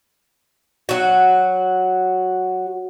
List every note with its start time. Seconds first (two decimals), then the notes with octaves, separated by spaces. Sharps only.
0.89 F#3 F#4